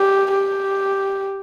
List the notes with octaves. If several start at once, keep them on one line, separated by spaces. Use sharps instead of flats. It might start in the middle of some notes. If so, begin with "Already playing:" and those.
Already playing: G4
G4